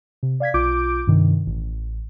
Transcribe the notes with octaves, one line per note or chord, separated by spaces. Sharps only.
C3
D5 F5 G#6 B6
B1 F4 D6 G6 D7
G2 C3 D#3
A1